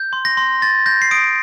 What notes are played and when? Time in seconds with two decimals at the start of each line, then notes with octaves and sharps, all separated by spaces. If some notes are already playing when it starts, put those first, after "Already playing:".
Already playing: G6
0.13 C6
0.25 A#6
0.37 C6
0.62 C6 A6
0.86 G6 A#6
1.02 C7
1.11 D#6 D7